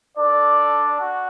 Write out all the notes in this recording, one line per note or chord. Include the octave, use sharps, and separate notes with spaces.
D4 A4 D5
F#4